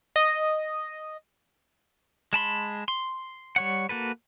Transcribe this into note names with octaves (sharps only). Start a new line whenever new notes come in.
D#5
G#3 A5 B5 C6
C6
G3 C#5 F#5
A#3 F#4 A4 B4